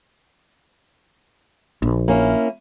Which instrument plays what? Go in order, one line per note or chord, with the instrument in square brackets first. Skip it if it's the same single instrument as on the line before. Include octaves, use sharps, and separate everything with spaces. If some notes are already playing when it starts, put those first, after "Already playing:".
[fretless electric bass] A#1
[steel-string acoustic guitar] A#3 C#4 E4